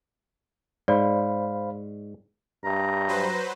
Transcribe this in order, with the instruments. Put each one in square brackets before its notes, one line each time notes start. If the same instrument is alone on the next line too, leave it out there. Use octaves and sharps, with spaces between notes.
[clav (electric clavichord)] G#2 [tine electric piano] C5 F5 B5 [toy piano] D5
[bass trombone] G2 [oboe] A#5
[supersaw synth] F#3 B4 C5